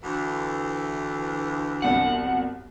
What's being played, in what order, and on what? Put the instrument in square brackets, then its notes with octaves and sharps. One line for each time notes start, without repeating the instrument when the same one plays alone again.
[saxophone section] D2 E3
[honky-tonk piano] G1 C2 F#3 [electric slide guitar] F#5